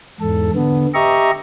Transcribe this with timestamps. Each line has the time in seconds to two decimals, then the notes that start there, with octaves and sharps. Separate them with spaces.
0.20 E2 G#2 A4
0.56 D3 B3
0.94 G4 D#5 E5 A#5 C#6